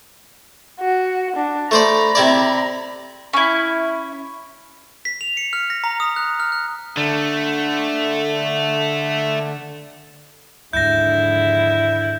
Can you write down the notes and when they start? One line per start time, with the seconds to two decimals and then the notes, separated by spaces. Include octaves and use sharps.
0.80 F#4
1.36 D4
1.71 A3 C5 D5 A#5 B5
2.15 C3 E4 D5
3.33 C#4 E4
5.05 B6
5.21 F7
5.37 C#7
5.53 F6
5.70 A#6
5.84 A#5
6.00 D#6
6.16 F#6
6.40 F6
6.52 F#6
6.97 D3 A3
10.73 D#2 G#2 D3 F3 G#3 E4 G6 A#6